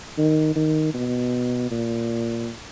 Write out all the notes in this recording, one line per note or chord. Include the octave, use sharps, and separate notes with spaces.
D#3
D#3
B2
A#2